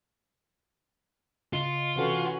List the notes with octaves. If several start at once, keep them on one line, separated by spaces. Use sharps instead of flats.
C#3 F4 D#5 C#7
C3 E3 C#4 F#4 A4 B4